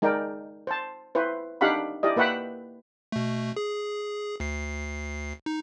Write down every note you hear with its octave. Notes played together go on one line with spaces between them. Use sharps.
G#3 D#4 A#4 D5 G5
C5 A5
E4 B4 C5
D4 D#4 G4 F5 F#5 B5
E4 G4 D5 D#5
A#3 B4 E5 F#5 G5 B5
B2 A3
G#4
D2 C7
D#4